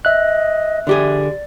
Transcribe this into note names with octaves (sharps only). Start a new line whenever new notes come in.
D#5 E5 F#6
D3 G4 G#4 D5